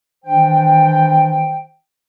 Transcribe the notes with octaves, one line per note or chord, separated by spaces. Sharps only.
D#3 E3 D4 C5 G5